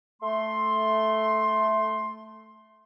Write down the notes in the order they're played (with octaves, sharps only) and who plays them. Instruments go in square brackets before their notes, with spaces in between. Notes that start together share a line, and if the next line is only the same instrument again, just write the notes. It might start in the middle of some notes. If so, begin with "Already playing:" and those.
[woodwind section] A3 C6